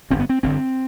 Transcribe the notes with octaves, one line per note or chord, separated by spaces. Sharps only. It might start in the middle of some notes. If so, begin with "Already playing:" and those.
G1 F#2 D3 C4
B3
C4
G1 G2 D3 C4